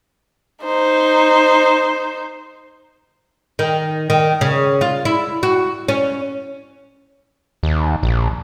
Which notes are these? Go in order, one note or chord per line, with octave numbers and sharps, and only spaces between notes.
D#4 C5
D#3
D#3
C#3
F4
E4
F#4
C#4
D#2
A#1